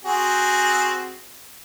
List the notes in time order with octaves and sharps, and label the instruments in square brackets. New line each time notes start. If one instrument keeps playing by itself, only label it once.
[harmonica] C4 F#4 G#4